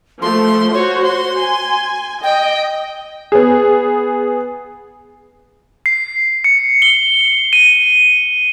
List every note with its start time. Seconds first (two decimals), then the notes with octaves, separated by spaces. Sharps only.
0.22 F3 A3 C6
0.74 F#4 C5 C#5
1.03 C6
1.40 G#5
2.23 D#5 G5
3.32 B3 G#4
5.86 C7
6.44 C#7
6.82 G7
7.53 D#7